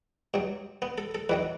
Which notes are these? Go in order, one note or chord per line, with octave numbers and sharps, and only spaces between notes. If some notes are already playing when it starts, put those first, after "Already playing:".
G2 F#3
B3
A4
A4
E2 D#3 F#3 B4